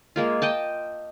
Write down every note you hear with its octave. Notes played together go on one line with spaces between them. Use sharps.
G#3 A#3 F4
D#5 G5 A5